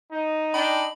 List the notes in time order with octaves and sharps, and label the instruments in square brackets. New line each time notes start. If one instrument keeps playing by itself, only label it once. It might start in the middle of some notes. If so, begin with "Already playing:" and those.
[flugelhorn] D#4
[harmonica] D4 G5 [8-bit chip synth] B5